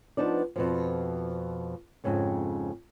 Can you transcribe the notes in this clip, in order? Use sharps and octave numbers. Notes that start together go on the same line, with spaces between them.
F3 B3 D4 D#4 D5
F2 B2 F3
F2 G#2 C#3 C4